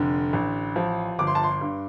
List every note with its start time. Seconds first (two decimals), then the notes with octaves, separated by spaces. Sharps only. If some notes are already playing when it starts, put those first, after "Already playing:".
Already playing: F1 D3
0.33 A1
0.76 F3
1.19 G1 D6
1.27 C6
1.35 A5
1.43 C6
1.61 G2